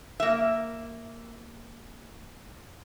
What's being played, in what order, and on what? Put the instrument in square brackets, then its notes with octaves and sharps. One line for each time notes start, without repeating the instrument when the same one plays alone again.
[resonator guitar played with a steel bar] A#3 E5